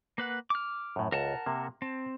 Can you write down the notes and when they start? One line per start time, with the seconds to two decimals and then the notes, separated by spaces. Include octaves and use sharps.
0.18 A#3 B4 F#5
0.50 D6 F6
0.96 F#2 A2
1.12 C#2 A#4 F#5 A5
1.46 C3 A#3
1.82 C4 A5